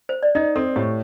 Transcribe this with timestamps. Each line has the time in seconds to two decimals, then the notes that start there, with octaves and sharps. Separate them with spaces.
0.09 C5
0.23 D5
0.35 D#4 D#5
0.56 C4 A4
0.76 A2 G4